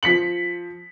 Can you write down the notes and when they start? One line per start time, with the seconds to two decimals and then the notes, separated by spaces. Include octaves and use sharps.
0.03 F3 B6 C#7 F#7